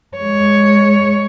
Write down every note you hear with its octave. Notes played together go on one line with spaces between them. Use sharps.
G#3 C#5